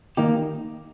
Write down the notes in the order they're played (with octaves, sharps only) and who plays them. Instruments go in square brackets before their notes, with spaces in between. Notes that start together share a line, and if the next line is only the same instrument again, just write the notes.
[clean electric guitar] D#3 A#3 D#4 G4